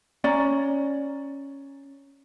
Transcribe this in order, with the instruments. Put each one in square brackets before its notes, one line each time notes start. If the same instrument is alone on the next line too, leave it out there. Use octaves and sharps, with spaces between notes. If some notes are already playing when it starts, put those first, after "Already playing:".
[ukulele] C#4 D5 A#5